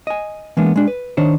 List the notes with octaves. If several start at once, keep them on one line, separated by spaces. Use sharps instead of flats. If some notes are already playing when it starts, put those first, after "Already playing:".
D#5 G#5
E3 G#3 A#3 B3 D4
G#3 D4
B4
D#3 D4 C5 C#5